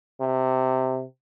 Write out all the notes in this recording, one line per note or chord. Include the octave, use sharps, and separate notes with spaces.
C3